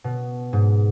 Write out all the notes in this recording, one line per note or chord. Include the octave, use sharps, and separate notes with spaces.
B2
G#2